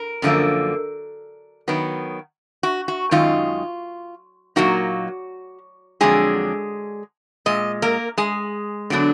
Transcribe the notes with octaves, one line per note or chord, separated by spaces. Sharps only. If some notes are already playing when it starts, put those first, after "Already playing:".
Already playing: A#4
F#2 D3 F3 A#3
D#3 F#3 B3
F#4
F#4
F#2 D#3 G#3 D#4 F4
A#2 F#3 A#3 D#4 F#4
F2 D3 F#3 G#3 D4 G#4
A#2 G#3 D#5
A#3 A#4
G#3 G#4
D3 F#3 B3 D4